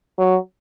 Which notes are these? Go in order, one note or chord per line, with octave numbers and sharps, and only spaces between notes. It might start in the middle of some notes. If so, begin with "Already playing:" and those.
F#3